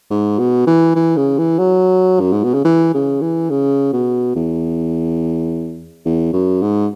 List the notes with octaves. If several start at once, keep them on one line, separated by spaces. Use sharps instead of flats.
G#2
B2
E3
E3
C#3
E3
F#3
F#2
G#2
B2
C#3
E3
C#3
E3
C#3
B2
E2
E2
F#2
G#2